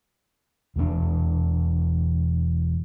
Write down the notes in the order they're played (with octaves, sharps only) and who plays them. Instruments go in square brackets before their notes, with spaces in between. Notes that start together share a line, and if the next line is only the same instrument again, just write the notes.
[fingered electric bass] E1 E2 F3 D4